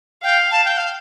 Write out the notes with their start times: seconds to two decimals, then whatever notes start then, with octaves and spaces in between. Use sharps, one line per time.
0.23 F5 G5
0.51 A5
0.65 G5
0.78 F5